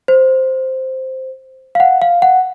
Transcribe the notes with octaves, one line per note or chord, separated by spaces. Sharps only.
C5
F5
F#5
F5
F#5